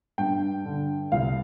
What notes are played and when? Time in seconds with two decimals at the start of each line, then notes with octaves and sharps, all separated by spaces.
0.18 G2 G5
0.65 D3
1.12 C2 F5